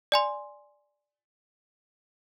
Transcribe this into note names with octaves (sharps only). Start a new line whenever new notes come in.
D5 G#5 C6